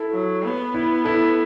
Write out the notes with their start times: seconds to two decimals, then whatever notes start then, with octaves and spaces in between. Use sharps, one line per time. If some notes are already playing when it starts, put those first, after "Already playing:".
Already playing: E4 A4
0.12 F#3
0.44 B3
0.74 E4
1.04 E4 A4